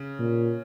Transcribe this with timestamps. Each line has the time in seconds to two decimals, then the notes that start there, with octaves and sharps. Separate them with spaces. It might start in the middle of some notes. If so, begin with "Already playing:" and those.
Already playing: C#3
0.19 A#2